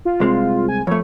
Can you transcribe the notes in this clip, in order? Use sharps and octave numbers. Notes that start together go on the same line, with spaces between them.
F4
C2 G#3 C4
G#5
F2 A3 C#5